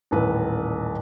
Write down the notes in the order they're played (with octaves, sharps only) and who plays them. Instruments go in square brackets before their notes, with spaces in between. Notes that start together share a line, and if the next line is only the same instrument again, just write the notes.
[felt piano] D#1 A1 B4